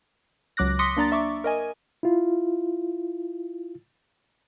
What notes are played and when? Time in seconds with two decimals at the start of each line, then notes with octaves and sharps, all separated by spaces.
0.57 C#2 F#3 D6 F#6 A#6
0.79 C6 D6 D#6 A#6 B6 C#7
0.97 A#3 D4 D5 A#5 A6
1.12 E5 C#6 D6
1.44 A#4 D#5 G#5
2.03 E4 F4